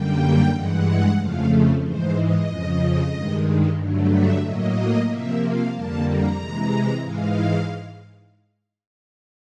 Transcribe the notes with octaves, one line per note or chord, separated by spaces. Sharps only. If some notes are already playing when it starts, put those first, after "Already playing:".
Already playing: F#2 D3 G3 A#3 G5
G2 E3 G#3 F#5
F2 C#3 F3 A3 F5
G#2 E3 G#3 C5
D#5
F2 C#3 F3
G2 D#3 G#3
G2 D3 F#3 A3
E5
A2 F#3 A#3 D#5
C3 F3 A#3 E5
F5
F2 D3 G3 A#3 A5
A#5
C3 E3 G#3
G#2 E3 G#3 F5